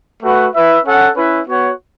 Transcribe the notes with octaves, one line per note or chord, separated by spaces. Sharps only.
A3 F#4 B4 F#5
E4 B4 E5
C#4 A4 F#5
C#4 E4 B4
B3 F#4 C#5 F#5